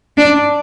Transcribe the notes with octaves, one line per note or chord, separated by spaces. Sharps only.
D4